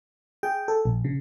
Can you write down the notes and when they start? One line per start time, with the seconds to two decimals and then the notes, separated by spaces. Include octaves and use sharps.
0.43 G#4 G5
0.68 A4
0.85 A#1
1.05 C#3